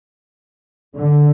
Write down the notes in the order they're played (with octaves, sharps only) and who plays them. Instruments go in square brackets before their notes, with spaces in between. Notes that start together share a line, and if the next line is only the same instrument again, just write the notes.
[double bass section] D3